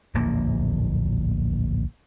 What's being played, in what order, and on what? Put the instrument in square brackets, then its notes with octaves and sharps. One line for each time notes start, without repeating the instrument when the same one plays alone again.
[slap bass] D1 A#1 E2 A#3